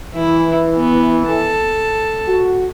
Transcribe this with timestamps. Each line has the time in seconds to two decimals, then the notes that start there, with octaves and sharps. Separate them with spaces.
0.15 E3 E4
0.76 B3
1.27 A4 A5
2.27 F#4